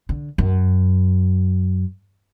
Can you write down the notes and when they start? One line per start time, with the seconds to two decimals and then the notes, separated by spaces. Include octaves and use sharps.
0.09 D3
0.38 F#2